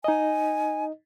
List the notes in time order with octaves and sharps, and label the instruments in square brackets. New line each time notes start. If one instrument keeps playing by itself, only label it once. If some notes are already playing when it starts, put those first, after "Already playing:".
[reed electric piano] D#4 D#5 [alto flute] G#5